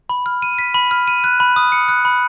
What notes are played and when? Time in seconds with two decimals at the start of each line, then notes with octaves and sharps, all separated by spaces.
0.09 B5
0.26 F6
0.42 D#7
0.59 B6
0.74 B5
0.91 F6
1.08 D#7
1.24 F#6
1.40 B5
1.56 D#6
1.72 C#7
1.88 F#6
2.05 B5